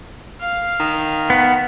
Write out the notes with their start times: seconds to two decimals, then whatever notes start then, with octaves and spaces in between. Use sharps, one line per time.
0.41 F5
0.80 D#3
1.30 B3